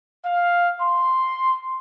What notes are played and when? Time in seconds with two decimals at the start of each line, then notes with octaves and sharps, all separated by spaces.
0.25 F5
0.81 C6